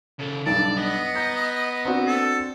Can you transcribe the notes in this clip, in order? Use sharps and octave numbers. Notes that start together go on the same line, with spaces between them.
C#3 A4
B1 G2 D5 A5
B3 D#5
A#5 G6
C4 D4 F#4
A4